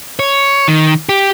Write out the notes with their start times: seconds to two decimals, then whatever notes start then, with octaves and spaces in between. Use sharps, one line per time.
0.19 C#5
0.68 D#3
1.09 G4